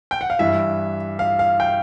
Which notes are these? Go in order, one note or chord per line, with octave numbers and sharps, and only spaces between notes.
G5
F#5
F5
G2 E3 E5
F5
F5
G5